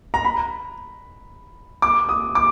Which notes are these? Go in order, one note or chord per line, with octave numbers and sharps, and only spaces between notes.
A#5
B5
D6
D#6
D6